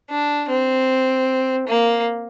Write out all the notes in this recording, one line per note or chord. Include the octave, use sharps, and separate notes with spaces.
D4
C4
A#3